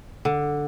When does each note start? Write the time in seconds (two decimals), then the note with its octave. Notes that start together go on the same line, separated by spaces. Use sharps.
0.25 D3